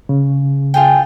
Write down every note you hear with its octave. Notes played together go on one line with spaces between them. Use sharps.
C#3
F4 G#4 G5